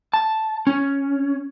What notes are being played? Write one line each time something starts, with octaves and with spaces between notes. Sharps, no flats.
A5
C#4